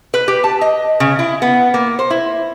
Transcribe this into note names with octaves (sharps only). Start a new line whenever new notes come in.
B4
G4
A5
D#5
C#3
E4
B3
A#3
C5
E4